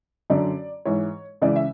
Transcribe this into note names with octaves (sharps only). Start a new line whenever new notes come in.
F#2 D3 D5
G#2 E3 C#5
C#2 C#3 E3 D5
E5